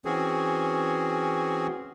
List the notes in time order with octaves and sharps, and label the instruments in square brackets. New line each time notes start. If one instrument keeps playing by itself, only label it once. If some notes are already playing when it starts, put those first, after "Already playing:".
[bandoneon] E3 C4 C#4 F#4 G#4